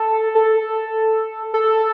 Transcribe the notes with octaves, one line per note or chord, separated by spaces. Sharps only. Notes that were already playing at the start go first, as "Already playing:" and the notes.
Already playing: A4
A4
A4